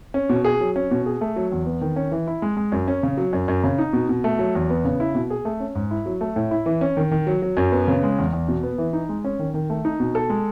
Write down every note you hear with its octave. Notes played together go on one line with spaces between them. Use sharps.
C#4
B2
G#4
F#3
C#4
B2
G#4
A3
F#3
E2
B3
D#3
C#4
E3
E4
G#3
G#3
F#2
C#4
C#3
F#3
F#2
F#2
C#3
D#4
B2
B2
A3
F#3
E2
B3
C#3
E4
B2
G#4
A3
C#4
G#2
E4
F#3
A3
A2
E4
E3
C#4
D#3
D#3
F#3
F#3
F#2
B3
C#3
G#3
E2
E2
B2
B3
E3
D#4
G#3
C#4
D#3
D#3
A3
D#4
B2
A4
G#3